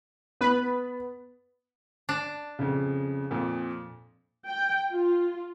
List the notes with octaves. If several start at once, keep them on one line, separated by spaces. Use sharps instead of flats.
B3 B4 B5
D4
F2 C#3
F2 A#2
G5
F4